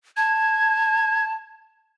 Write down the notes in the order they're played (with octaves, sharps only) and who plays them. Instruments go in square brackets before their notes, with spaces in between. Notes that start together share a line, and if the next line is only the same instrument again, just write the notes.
[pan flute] A5 [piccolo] G#6